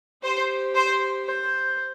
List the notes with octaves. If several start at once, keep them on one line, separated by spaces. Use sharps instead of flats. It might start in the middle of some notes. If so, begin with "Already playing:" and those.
G4 C5
C5
C5